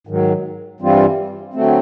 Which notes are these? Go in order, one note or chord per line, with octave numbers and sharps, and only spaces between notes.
G#2 D#3 F#3
G2 E3 G3 C4 F4
D3 F#3 A3 C4